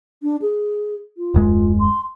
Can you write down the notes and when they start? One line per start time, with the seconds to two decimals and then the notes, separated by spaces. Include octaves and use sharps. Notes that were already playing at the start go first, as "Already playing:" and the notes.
0.23 D4
0.42 G#4
1.18 F4
1.34 D#1 F#2 G#3
1.79 C6